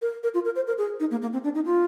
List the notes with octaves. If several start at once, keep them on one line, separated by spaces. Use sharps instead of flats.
A#4
A#4
F4
A#4
C5
A#4
G#4
D#4
A#3
A#3
C4
D4
D#4
F4